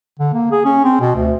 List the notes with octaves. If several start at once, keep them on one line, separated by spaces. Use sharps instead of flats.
D3
A#3
G#4
C#4
C4
B2
D2